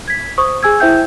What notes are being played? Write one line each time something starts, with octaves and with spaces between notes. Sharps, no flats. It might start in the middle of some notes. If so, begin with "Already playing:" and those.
G#6 B6
C5 C#6 D#6
G#4 G#5 E6 G#6
E4 C5 E5 G5 G6